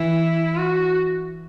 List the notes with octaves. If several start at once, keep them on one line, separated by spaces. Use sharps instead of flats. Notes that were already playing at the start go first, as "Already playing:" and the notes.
Already playing: E3 E4
F#4